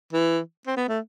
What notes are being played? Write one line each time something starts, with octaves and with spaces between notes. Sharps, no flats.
E3
C4
B3
A3